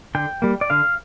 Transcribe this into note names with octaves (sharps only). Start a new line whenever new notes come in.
D3 G5
G3 A#3
D5
D3 F5